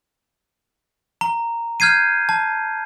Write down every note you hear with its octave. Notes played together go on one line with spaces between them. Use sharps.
A#5
F6 G6 G#6 C7 D#7
A5